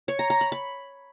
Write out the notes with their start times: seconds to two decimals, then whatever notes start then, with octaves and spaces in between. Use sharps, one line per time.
0.08 C#5
0.19 A#5
0.30 A#5
0.41 B5
0.52 B5